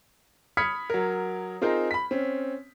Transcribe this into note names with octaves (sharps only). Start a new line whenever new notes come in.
B5 D#6 F6 G#6 B6 C#7
F#3 A#4
C4 D#4 F4 G#4 A#4 C5
B5 B6
C4 C#4